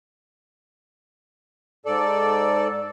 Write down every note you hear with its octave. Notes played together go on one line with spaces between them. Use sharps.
G#2 A4 D5